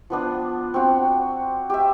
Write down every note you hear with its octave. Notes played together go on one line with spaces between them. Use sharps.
F3 B3 D4
C4 F#4
G4 E5